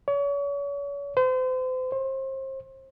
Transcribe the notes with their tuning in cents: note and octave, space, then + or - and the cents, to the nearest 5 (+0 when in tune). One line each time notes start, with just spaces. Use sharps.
C#5 +35
C5 -35
C5 +35